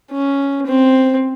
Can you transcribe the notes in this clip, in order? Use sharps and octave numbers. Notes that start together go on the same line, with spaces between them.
C#4
C4